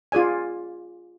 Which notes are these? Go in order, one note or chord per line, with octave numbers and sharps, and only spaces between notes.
F4 G#4 D5 G#5